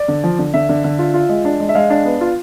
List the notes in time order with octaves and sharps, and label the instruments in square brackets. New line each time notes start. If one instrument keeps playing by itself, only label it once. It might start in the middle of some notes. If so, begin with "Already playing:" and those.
Already playing: [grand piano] D5
D3
F3
D3
D3 E5
D3
D3
F4
F4
G#3
D4
G#3
E5
G#3 F5
D4
B3
F4